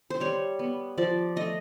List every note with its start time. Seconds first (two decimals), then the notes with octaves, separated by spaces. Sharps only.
0.10 C5
0.20 G3 C#5
0.59 B3
0.98 F3 D5
1.36 A3 D#5